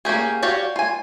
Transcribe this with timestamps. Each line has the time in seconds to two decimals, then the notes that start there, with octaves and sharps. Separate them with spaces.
0.05 A#3 C#4 G4 G#4
0.42 F#4 G4 C#5 D5 F5
0.76 F4 G#5